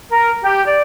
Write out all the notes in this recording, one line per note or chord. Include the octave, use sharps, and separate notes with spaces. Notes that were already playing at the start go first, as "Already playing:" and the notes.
A#4
G4
D5